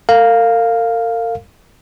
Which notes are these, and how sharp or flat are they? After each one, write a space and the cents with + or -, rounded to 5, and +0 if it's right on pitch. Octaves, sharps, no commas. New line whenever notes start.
A#4 -40 F5 +0